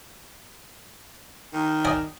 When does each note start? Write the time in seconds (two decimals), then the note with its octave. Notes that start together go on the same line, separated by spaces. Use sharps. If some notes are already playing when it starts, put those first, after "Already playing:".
1.53 D#3
1.85 D5 D#5 G#5